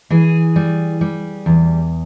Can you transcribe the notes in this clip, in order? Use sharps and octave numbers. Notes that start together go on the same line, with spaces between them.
E3 G#4
G3
G3
E2